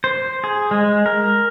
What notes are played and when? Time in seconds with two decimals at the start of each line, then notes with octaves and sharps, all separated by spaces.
0.04 C5
0.44 G#4
0.71 G#3
1.06 A#4